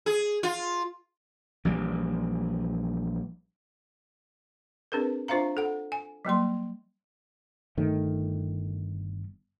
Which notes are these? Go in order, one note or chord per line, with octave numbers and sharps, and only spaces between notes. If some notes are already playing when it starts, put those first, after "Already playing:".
G#4
F4
A#1 E3 G3
C4 D4 G#4 A#4 B4
D4 F4 C5 E5 F5 A#5
A4 F#5
G#5
F#3 G3 A#3 C6
G1 D#3 A3